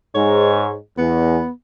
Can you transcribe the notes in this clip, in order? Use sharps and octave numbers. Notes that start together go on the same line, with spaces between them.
G#2 C#5
E2 B3